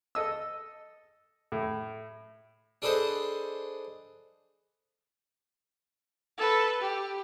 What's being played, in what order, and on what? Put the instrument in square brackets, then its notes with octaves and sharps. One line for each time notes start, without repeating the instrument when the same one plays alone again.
[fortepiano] A4 D#5 E6
A2
[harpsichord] D4 G#4 A4 B4 C5 D#5
[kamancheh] A4 B4
G4